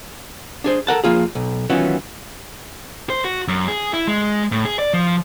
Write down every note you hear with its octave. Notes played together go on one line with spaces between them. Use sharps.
D4 G#4 C5
A4 A#4 F#5 A5
F3 A#3 F4 G#4
B1
D#3 E3 F#3 B3 C#4 F4
C5
F#4
F#2
G#4
E4
G#3
A2
G#4
D5
F3